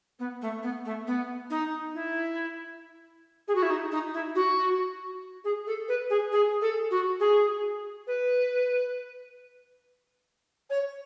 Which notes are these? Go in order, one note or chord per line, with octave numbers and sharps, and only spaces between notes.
B3
A3
B3
A3
B3
D#4
E4
G#4
F#4
E4
D#4
D#4
E4
F#4
G#4
A4
B4
G#4
G#4
A4
F#4
G#4
B4
C#5